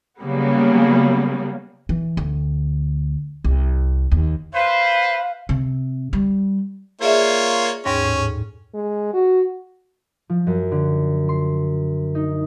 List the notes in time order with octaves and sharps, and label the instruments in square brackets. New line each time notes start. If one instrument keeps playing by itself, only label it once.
[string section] C#3 F#3 G3 A#3 B3
[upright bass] E3
D2
C2
D#2
[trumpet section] B4 C5 [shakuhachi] F5
[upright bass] C3
G3
[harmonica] A#3 F4 C#5 [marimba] G#4 D5 E5
[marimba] D#2 G#2 A#6 [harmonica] C#4
[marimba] A2
[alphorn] G#3
F#4
[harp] F3
F#2
D3
C6
D#4